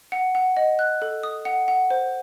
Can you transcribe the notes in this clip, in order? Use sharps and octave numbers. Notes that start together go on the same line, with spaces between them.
F#5
F#5
D#5
F#6
A4
D#6
F#5
F#5
C5